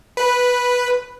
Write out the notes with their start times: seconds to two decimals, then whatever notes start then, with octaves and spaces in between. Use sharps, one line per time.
0.17 B4